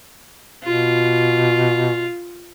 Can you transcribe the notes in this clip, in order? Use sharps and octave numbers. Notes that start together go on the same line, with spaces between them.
B2 F4